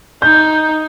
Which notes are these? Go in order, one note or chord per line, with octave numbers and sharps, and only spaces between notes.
D#4 G6